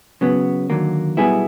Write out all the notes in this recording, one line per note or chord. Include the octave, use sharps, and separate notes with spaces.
C#3 F#3 B3
D#2 D3 F#3 A#3
B1 B2 G3 B3 E4 G#4